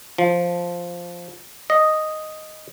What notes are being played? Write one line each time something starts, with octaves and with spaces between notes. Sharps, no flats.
F3
D#5